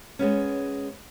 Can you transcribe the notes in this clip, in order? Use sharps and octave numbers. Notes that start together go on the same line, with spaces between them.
G#3 B3 C#4